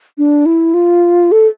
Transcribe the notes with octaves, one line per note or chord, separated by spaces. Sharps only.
D4
E4
F4
A4